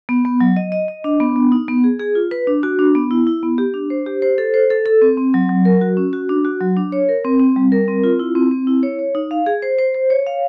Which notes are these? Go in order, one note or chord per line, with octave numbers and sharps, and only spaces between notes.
B3
B3
F#3
D#5
D#5
D#5
D4
B3
B3
D#4
B3
G#4
G#4
F4
B4
D4
F#4
D4
B3
E4
E4
B3
G4
D4
C5
G4
C5
A4
C5
A4
A4
C4
C4
F#3
F#3
A#4
F#4
C#4
F#4
D4
F#4
F#3
D4
C#5
A#4
C4
C4
G3
A#4
C4
F4
E4
C4
C4
E4
C#5
C#5
D#4
F5
G#4
C5
C5
C5
C#5
F5